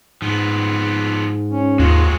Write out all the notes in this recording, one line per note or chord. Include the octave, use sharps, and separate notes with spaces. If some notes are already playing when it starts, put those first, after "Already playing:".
G#2 F3 B3
C#4
D#2 G#3 F4 F#4